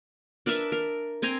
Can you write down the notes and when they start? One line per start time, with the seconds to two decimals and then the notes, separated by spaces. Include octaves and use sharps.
0.46 D4 A#4 B4 E5
0.72 A#4
1.22 C4 G5 G#5 A#5